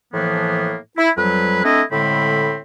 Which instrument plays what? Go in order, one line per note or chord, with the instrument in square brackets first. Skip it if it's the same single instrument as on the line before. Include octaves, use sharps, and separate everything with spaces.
[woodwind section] A2 E3 F3 A#3 B3
E4
F2 F#3 G3 B4
A3 C4 D4 E4 D#5
A2 D3 G#3 C4 B5